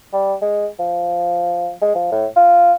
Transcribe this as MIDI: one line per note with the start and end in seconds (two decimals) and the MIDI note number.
0.13 0.34 55
0.42 0.66 56
0.79 1.71 53
1.82 1.95 56
1.95 2.11 53
2.12 2.27 45
2.36 2.73 65